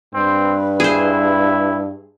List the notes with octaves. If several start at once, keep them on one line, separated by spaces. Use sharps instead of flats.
G2 C4 B4
E4 G#4 C5